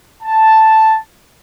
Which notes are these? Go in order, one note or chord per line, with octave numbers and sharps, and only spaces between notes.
A5